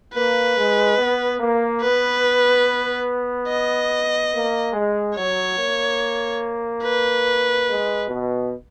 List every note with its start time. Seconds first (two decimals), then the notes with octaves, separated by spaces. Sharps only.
0.14 A#3 B4
0.57 G#3
0.98 B3
1.39 A#3
1.82 B3 B4
3.48 D#5
4.32 A#3
4.73 G#3
5.16 F#3 C#5
5.57 A#3
6.83 B4
7.66 G#3
8.08 B2